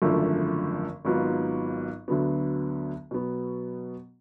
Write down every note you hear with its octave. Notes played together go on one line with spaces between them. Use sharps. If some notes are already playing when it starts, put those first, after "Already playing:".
G#1 F#2 D3 F3 A3
G#1 G#2 F#3 B3 F4
D2 D3 F#3 B3
B2 F#3 B3